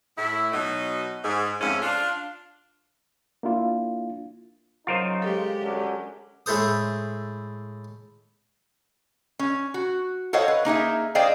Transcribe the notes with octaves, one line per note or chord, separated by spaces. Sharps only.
A2 E4
B2 F#3 D#4
G#2
F2 G#2 C#3 A3 A#3 C#4
D4 F4
A#3 D4 E4 F4
C#3 F#3 D#4 F4 A#4 C5
G#3 G4 A4
F#2 D3
A2 G#3 E4 A4 C5 D#6
C#4
F#4
A4 C5 C#5 D#5 F5 F#5
B4
A#3 D#4 G#4 E5
G#4 C5 D5 D#5 F5 G5